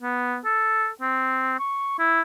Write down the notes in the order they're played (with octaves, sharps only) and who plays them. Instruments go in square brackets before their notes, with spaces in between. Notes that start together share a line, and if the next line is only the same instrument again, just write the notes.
[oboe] B3
A4
C4
C#6
E4